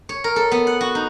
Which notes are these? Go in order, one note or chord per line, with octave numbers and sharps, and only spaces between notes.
C#5
A#4
A4
B3
F#5
F#4
D#4